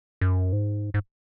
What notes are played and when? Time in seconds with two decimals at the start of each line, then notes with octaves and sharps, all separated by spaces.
0.21 F#2
0.53 G#2
0.94 G#2